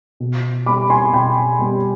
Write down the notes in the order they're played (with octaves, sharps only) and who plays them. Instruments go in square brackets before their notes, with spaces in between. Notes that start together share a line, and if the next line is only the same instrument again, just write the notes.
[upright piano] B2
G3 B3 B5 D6
G#5 C6
B2 G5 B5
G3 B3